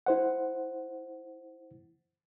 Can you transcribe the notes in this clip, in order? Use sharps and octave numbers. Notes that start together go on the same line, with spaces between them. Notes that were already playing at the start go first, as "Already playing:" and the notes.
E4 C5 F#5